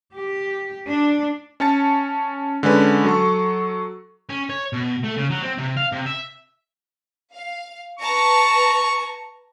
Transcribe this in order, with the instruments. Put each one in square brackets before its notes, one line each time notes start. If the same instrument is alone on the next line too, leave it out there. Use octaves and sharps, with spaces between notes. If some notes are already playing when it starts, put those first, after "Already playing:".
[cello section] G4
D4
[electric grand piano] C#4 C#5 A5 A6 C#7
D3 G#3 C#4 B4
F#3 A4 C#6
[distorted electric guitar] C#4
C#5
B2
A3
C#3
F#3
C4
C3
F5
C3
E5
[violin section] F5
[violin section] B4 A5 A#5 [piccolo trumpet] C#6